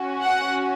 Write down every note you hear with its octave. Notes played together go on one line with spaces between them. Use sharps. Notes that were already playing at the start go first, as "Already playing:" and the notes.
Already playing: C#4 F#4
F#5